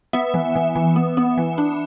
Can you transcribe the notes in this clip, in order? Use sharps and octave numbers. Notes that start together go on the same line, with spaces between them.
B3 E5
E3
E3
E3
B3
B3
E3
D4